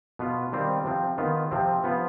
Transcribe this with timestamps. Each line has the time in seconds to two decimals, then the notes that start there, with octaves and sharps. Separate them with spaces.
0.19 B2 B3 F4
0.52 D#3 G3 C4 F4
0.85 C3 F3 C4
1.18 D#3 B3 F4
1.51 C3 F3 C4
1.84 F3 B3 F4